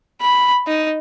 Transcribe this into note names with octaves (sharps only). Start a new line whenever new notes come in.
B5
D#4